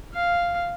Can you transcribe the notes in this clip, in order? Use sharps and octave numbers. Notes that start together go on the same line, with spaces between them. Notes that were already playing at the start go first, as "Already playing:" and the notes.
F5